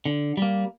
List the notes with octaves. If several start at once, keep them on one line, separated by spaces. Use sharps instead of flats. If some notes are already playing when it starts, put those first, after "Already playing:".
D3
G3 A#3